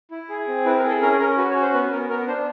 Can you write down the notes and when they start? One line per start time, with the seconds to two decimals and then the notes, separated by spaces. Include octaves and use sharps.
0.11 E4
0.29 G#4
0.48 C4
0.65 E4 B4
0.77 A#4
0.84 G#4
0.89 A4
1.02 C#4 A#4
1.19 C#4 A#4
1.37 F#4 B4
1.50 C#5
1.56 C#4
1.62 C5
1.73 B3 B4
1.91 B3 A#4
2.10 B3 A#4
2.27 D4 C5